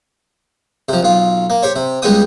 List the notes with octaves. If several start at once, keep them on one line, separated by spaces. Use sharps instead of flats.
C3 F3
B1 F4
A#3
G4 C5 C#5
C3
C#2 G3 G#3 B3 G5 D#6